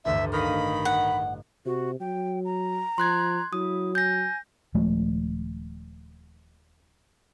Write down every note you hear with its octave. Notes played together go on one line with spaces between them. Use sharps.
A1 D2 G2 E5
D#3 D#5 F5 B5 F6
F#5
C3 F#4
F#3 G5
A#5
F3 C6 F#6 G#6
F#3 E4 D#6
G#5 G6 A#6
D#1 F3 G#3 A3